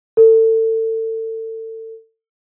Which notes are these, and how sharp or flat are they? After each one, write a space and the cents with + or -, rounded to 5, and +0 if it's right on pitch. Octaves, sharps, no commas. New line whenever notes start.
A4 +30